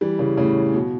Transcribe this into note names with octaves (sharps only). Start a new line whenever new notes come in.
E3 G3
C#3 E3
A2 C#3
B2